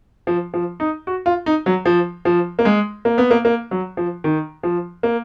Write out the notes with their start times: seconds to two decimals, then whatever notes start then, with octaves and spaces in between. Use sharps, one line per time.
0.27 F3
0.54 F3
0.80 D#4
1.07 F#4
1.26 F4
1.46 D#4
1.66 F#3
1.85 F3
2.25 F3
2.59 A#3
2.65 G#3
3.05 A#3
3.18 B3
3.31 A#3
3.45 A#3
3.71 F#3
3.97 F3
4.24 D#3
4.63 F3
5.03 A#3